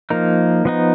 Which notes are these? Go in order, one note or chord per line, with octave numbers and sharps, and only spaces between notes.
F3 A#3 D#4 A#4
F3 B3 D#4